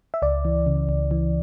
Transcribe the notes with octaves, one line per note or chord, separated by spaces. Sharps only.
E5
C#2 D5
E3
C#3
C#2
E3